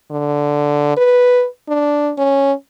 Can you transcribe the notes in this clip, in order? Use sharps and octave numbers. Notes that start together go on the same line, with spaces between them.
D3
B4
D4
C#4